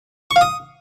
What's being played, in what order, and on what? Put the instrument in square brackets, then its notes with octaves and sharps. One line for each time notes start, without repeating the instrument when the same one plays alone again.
[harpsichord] C#6
F5
D#6